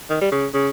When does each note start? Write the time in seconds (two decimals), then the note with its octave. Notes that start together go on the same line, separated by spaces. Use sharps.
0.10 D#3
0.21 G3
0.32 C#3
0.54 C#3